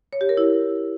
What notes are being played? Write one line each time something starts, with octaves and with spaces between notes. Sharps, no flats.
C#5
G4
A#4
E4